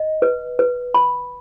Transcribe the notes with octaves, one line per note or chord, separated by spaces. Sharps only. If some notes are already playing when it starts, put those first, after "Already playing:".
Already playing: D#5
B4
B4
B5